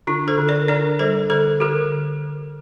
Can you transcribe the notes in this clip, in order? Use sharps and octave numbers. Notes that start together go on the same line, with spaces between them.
D3 D4 F4
A4 C5
D3
A#4 D5
D4 A#4 D5
G3 A4 C5
D3 A4 C5
D3 G4 A#4